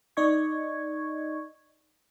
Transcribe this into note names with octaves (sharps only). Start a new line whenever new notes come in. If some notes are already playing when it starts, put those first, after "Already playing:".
D#4 D5 D#5 C#6 G#6